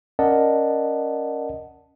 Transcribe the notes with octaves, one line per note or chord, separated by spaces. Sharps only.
C#4 A#4 D5 D#5 F#5 A5